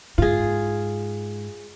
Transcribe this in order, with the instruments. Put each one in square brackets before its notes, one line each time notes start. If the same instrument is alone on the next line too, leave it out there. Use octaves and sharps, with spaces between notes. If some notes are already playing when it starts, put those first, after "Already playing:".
[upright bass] G#2 [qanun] F4 G#4